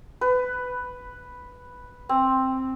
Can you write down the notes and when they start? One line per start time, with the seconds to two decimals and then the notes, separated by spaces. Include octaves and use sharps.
0.21 B4
2.09 C4